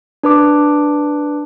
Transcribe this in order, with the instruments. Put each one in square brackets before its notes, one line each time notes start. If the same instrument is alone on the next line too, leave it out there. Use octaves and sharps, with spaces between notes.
[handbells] D4 B4 D6